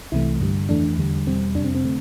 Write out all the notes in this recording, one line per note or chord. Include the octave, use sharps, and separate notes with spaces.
C2 C3 E3 A3 E4
G2 D3 G3
F2 E3 A3 D4
E2 D3 G3
E2 B2 G3 C4
F2 C3 G3 D4
C4
C4
D3 A3